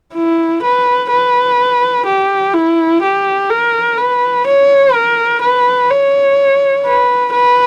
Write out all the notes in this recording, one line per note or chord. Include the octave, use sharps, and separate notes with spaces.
E4
B4
B4
G4
E4
G4
A#4
B4
C#5
A#4
B4
C#5
B4
B4